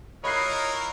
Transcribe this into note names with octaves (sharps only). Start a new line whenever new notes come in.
E4 F4 A#4 C#5 D#5 B5 F#6 C7